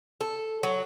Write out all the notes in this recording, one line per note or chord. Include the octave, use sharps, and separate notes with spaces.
A4
F#3